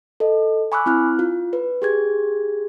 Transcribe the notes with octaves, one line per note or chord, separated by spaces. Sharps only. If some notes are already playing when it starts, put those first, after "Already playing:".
A4 D#5
G#5 B5 C#6 D6 E6 F#6
C4 E4 F6 F#6
F4
B4
G4 G#4 G#6